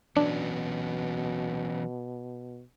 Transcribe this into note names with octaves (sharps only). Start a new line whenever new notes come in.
B2 E3 F#3 C#4 D4